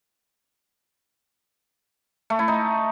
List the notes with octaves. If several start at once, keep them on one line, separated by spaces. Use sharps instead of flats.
A3
E4
D#4